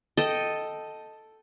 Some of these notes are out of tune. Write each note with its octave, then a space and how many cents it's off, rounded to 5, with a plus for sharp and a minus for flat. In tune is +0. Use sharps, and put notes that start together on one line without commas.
A4 +0 D#5 +0 G5 -5